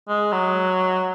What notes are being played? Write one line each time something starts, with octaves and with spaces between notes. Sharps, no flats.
G#3
F#3